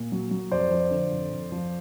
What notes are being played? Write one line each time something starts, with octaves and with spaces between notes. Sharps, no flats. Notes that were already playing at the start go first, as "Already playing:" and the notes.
Already playing: A#2
F#3
F#3
F2 C5 D5
F3
D3
F2
F2
F3